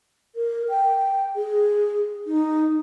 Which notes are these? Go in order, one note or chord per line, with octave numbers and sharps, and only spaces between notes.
A#4
G5
G#4
D#4